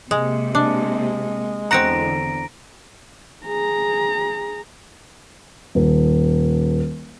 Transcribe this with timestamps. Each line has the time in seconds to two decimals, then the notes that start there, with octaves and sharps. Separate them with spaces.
0.11 C3 G#3 A#3
0.55 G#3 D4
1.71 E2 D3 C4 F#4 F#5 A#5 A#6 D7
3.46 G#4 A#5
5.75 D#1